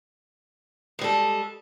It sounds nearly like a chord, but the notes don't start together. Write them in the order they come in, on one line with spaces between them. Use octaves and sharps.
G#3 G3 A4